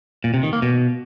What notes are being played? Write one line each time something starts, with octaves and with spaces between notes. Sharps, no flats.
A#2
C3
D#3
A#3
B2